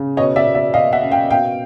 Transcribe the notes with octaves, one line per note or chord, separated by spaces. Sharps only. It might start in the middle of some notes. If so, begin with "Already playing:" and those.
Already playing: C#3
B2 C#5 D#5
D5 E5
B2
D5 E5
B2 D#5 F5
E5 F#5
C#4
F5 G5
B2 F5 G5